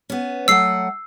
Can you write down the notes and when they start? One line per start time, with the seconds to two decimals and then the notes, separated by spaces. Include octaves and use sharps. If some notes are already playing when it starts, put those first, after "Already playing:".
0.10 B3 C#4
0.48 F#3 A3 F#5 E6 C7